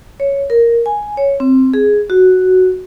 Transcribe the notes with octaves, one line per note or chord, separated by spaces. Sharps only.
C#5
A#4
G#5
C#5
C4
G#4
F#4